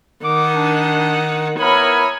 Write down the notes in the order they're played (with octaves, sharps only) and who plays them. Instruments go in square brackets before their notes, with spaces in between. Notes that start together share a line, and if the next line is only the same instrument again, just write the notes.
[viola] D#3 F#5 [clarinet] D6
[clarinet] D4
[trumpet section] B3 E4 A#4 [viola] C#5 G#5 [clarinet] B5